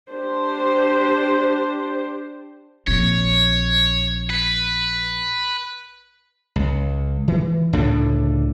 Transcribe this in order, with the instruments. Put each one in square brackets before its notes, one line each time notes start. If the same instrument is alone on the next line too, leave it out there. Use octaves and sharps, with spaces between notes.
[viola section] D4 G4 C5
[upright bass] A#1 C4 [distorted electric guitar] C#5
[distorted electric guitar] B4
[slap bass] C#2
E3
C#2 A2 D3 D4